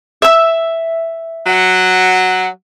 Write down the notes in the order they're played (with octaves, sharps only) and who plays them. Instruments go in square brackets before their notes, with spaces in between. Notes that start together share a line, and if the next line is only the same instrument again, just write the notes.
[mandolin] E5 E6
[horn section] F#3 F#5